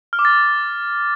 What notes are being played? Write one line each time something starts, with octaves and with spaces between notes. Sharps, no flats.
F6
D6
A6